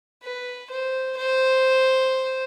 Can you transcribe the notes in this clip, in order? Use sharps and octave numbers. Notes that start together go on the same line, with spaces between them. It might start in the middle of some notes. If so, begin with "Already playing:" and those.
B4
C5
C5